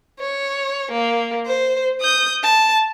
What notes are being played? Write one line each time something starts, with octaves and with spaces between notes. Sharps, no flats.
C#5
A#3
C5
D#6 G6
A5